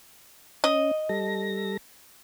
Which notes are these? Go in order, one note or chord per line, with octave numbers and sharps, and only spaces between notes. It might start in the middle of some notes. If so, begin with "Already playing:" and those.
C#4 D#5
G3 A4 A#6